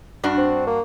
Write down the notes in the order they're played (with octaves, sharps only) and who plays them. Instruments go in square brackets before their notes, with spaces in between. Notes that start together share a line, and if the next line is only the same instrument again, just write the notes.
[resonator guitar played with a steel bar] G2 D4 F#4
[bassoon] C4
A#3